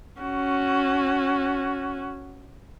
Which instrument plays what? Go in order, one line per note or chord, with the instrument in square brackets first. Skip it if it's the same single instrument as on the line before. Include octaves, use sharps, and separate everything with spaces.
[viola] C#4 F#4